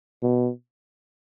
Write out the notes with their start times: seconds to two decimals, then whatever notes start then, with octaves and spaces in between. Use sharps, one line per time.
0.22 B2